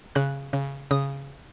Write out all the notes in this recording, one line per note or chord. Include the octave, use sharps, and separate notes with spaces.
C#3 F#6
C#3
C#3 D#6